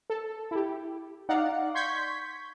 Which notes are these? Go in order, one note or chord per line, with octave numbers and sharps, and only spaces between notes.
A4
E4 G4
D#4 D5 F5 F#5
C6 C#6 G6 G#6 B6